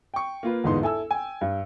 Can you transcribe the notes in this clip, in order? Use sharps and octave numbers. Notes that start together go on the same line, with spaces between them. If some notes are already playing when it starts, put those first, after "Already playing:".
G5 C#6
A#3 F4 B4
G1 E2 G#2 B3 D#4 C6
E4 A4 G#5 E6
G5 G#5
G2